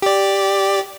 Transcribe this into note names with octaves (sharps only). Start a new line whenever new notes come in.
G4 D5